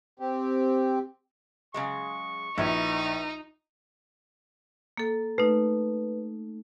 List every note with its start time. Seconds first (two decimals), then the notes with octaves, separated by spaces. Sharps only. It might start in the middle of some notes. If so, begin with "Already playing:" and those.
0.20 C4 G4
1.74 C#3 F#3 G#3 C#6
2.58 A#1 D#4 E4 B4
4.97 A#3 A4
5.38 A3 D#4 B4